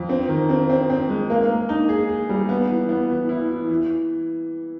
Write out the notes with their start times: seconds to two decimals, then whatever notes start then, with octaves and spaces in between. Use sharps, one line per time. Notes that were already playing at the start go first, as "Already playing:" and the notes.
Already playing: F2
0.09 C4
0.28 D#3
0.49 C4
0.70 C4
0.90 C4
1.09 G#3
1.30 A#3
1.50 A#3
1.69 D#4
1.89 G#4
2.09 G#4
2.29 G3
2.49 B3
2.70 E3
2.89 B3
3.10 E3
3.29 E4
3.50 E3
3.69 E3